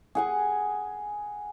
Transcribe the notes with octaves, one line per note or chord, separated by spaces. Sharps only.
G#4 F#5 G#5